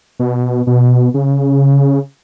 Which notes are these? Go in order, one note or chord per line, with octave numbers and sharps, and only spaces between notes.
B2
B2
C#3